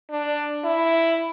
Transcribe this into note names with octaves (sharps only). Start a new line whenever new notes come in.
D4
E4